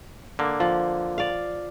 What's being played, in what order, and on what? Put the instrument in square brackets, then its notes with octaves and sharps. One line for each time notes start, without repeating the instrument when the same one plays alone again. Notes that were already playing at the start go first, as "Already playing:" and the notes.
[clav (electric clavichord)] D3 A#3
[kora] F3
D5 F5